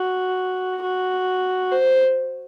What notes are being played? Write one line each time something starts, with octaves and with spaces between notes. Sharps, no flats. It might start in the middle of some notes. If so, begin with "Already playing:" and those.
Already playing: F#4
F#4
C5